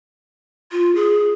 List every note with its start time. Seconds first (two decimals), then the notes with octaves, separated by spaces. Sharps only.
0.72 F4
0.95 G#4